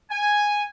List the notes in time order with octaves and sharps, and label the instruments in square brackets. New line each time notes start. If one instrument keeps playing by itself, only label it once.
[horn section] G#5